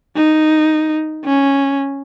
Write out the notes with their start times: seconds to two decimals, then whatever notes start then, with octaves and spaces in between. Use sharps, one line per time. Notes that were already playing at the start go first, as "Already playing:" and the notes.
0.16 D#4
1.25 C#4